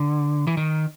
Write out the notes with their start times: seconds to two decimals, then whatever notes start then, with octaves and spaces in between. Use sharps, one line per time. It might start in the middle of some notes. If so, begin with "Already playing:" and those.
Already playing: D3
0.47 E3
0.57 D#3